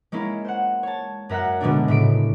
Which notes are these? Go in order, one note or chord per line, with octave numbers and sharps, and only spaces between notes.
G#3 A#3 C#4 E4
C5 F#5
C#5 A5
F#2 A#4 E5 F#5 F#6
B2 D3 F#3 G#3 A3 D4
A2 C#3 E5 D7